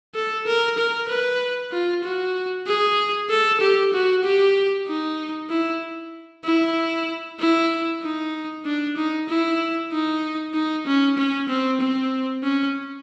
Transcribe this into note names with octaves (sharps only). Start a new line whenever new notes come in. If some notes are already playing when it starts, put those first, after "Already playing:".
A4
A#4
A#4
B4
F4
F#4
G#4
A4
G4
F#4
G4
D#4
E4
E4
E4
D#4
D4
D#4
E4
D#4
D#4
C#4
C#4
C4
C4
C#4